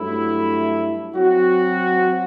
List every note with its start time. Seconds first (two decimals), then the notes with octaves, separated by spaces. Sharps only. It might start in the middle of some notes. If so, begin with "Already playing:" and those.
Already playing: G2 F#3 A3 E4
1.14 F#3 C4 F#4